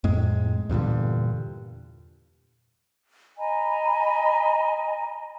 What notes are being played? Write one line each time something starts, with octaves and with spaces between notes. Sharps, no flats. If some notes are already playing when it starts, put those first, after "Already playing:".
F2 A2 G#3
E2 G2 A#2 D3
D#5 G#5 A#5 B5